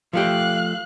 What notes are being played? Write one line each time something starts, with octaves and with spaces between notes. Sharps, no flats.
F3 A3 G4 F5 F#6